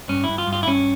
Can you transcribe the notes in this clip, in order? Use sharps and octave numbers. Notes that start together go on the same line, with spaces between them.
G2 C#4
G2 E4
F4
G2
F4
E4
G2 C#4